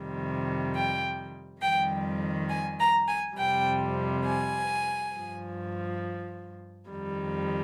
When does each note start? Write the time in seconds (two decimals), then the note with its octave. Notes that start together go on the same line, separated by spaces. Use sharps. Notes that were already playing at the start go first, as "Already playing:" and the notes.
Already playing: F2 C3 D#3 G3
0.74 G5
1.61 F2 D#3 G3 G5
2.49 G#5
2.79 A#5
3.08 G#5
3.37 F2 C3 G3 G5
4.25 G#5
5.12 G2
5.18 F3
6.89 F2 D#3 G3